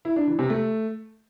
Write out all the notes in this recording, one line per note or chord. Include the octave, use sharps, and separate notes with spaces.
E4
D4
E3
C3
A3